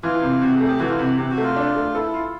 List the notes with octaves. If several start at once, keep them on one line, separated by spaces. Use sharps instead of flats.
E3 F4
C3
C3 F#4
G#4
A3
G4
E3 F#4
F4
C3 F#4
C3 G4
F#4
A3
F4
D4
A3
E4 A4
F4